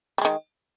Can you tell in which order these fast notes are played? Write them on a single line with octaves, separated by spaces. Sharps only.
G3 G#3 D#3